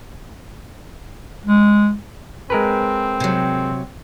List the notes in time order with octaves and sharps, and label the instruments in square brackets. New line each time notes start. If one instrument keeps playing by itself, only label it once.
[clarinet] G#3
[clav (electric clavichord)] G#3 A#4 B4 [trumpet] C4
[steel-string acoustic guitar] C3 F#3